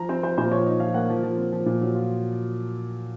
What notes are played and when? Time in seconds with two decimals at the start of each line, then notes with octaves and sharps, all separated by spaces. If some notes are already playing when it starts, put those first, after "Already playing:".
Already playing: F3 A#5
0.09 C4 C5
0.23 F3 C5
0.38 A#2 C5
0.51 F3 C#5
0.66 D#4
0.80 F3 F5
0.94 A#3 F#5
1.10 F3
1.23 F3
1.37 C4
1.52 F3
1.66 A#2
1.81 F#3
1.95 F4